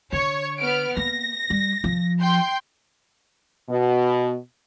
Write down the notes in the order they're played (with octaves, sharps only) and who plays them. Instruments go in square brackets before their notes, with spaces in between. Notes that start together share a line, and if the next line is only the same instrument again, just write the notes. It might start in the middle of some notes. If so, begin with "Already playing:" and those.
[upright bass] D3 [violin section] C#5 C#6
[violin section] B3 F6 D7
[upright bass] A#3 [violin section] A#6
[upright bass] G3
F3
[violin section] G5 C6 G6
[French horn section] B2